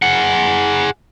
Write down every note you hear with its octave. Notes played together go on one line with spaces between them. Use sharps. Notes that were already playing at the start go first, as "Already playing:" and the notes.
G#4 F#5